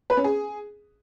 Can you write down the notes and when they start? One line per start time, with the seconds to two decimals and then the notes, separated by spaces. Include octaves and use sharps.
0.10 B4
0.17 C#4
0.24 G#4